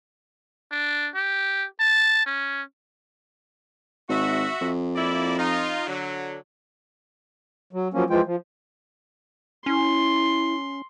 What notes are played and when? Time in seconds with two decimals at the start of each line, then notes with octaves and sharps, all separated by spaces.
0.72 D4
1.15 G4
1.80 A5
2.26 C#4
4.09 G#1 F#4 E5
4.61 F2
4.96 A#3 E4 D5
5.38 D#4 F4
5.87 D3 F#3
7.73 F#3
7.94 F3 F#3 A#3 C#4
8.10 E3 F3 G#3 F4 G5
8.25 F3
9.66 C#4 E4 C6